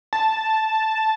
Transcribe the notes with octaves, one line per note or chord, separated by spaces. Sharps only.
A5